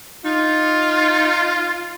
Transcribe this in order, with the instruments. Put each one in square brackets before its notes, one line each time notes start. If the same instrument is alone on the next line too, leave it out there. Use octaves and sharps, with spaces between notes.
[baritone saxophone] D#4 [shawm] F4